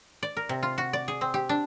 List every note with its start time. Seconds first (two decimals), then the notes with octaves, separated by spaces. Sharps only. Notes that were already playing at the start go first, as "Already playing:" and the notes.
0.23 D5
0.37 A#4
0.49 C3
0.63 F4
0.78 F#4
0.93 D5
1.08 G#4
1.21 C4
1.34 G4
1.49 D4